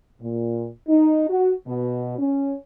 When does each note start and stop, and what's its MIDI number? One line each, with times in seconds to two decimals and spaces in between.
0.21 0.67 46
0.88 1.29 63
1.29 1.52 66
1.67 2.17 47
2.19 2.56 61